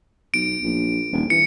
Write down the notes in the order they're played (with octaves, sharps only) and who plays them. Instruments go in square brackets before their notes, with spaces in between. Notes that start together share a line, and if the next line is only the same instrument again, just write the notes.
[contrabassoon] B1 [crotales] D7
[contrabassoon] A#1
D#1
[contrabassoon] E3 [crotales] C#7